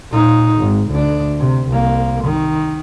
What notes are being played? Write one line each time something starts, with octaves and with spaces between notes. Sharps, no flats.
A#2 D#4
G#1
D2 D4
C3
C2 A#3
D#3